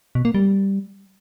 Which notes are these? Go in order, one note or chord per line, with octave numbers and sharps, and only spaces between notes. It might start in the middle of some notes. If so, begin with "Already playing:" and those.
B2
A#3
G3